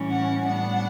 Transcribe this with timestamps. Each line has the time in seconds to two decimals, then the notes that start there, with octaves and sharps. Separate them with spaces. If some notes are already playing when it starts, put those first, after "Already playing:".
Already playing: A2 E3 G3 C#4
0.10 F#5
0.46 A2 G3 B3 D4 F#5